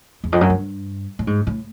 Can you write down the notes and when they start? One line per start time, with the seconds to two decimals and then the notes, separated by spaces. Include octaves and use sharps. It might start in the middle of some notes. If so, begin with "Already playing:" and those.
0.24 E2
0.32 F2
0.41 F#2
0.50 G2
1.19 A2
1.27 G#2
1.47 A2